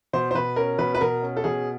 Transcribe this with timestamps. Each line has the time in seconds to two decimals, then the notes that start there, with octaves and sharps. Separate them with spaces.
0.13 B2 C5
0.31 C5
0.35 B2 B4
0.56 C#4 A#4
0.79 B2 B4
0.95 B4
1.01 B2 A#4
1.22 C#4
1.37 A4
1.44 B2 G#4